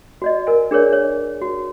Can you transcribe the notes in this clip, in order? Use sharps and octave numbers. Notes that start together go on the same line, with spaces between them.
F#4 D5 D#5
A#4 G#5
D4 G#4 A#4 C#5 D5
C#5
F#4